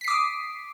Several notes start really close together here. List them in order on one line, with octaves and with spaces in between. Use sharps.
B6 C7 D6 D#6